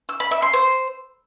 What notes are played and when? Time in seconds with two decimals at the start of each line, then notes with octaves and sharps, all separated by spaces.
0.09 E6
0.20 B5
0.31 E5
0.42 C6
0.53 C5